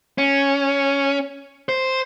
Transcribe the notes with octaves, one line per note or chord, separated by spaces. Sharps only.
C#4
C5